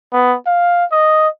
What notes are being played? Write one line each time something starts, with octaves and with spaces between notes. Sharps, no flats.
B3
F5
D#5